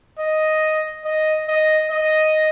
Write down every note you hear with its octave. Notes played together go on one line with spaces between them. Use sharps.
D#5
D#5
D#5
D#5